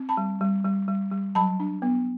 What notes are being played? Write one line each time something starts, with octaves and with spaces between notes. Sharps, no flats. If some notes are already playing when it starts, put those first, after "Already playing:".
Already playing: C4
A5 B5
G3
G3
G3
G3
G3
F#3 A5 B5
D4
B3